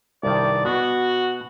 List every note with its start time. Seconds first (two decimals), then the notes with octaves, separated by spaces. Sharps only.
0.23 C2 G2 D#3 D5
0.65 B2 B3 F#4